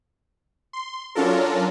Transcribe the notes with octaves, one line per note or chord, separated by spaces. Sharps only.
C6
F#3 C#4 D4 F4 A4 A#4